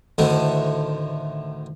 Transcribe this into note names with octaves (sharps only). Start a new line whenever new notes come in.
D2 A2 D3 D#3 C4